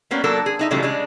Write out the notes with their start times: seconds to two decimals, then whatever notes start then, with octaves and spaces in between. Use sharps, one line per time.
0.11 G3 A#3 B3 C#4
0.24 F#3 A#3 D4 A4 A#4
0.46 G#4
0.59 D4 D#4 E5
0.71 A#2 C#3 E3 F#3 G3 A3
0.83 C#3 G#3 D4